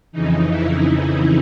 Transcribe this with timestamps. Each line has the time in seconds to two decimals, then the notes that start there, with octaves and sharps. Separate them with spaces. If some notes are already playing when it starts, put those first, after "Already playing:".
0.12 F2 C#3 E3 D#4
0.49 E4
0.86 E4